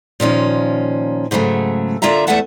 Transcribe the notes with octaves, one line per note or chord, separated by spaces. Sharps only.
A#2 D#3 F3 C#4
G#2 C#3 F#3 G3 A3
D3 A#3 F4 E5 A#5
E2 A3 A4 E5 F#5 A5